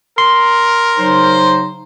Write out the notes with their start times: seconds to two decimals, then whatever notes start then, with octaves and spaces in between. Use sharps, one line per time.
0.18 A#4 C6
0.98 C#3 F#3 D#4 C5